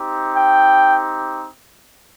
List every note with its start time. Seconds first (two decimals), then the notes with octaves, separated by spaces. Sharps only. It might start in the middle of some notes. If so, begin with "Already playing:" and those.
Already playing: C4 D#4 G4
0.37 G5